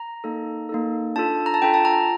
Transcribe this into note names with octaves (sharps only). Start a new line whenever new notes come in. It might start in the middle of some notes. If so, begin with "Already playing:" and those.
Already playing: A#5
A#3 D#4 A4
A#3 D#4 A4
D4 F4 A4 A5
A#5
A5
D4 F4 A4 G5
A5
A#5